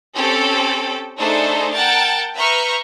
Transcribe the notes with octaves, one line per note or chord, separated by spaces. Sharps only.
C4 C#4 G4 A4 G5
A3 D4 D#4 G#4 A4 C5
A#4 F#5 G5 A5
B4 E5 A#5 C#6 F6 G6